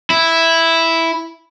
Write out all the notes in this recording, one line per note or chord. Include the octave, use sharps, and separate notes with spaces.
E4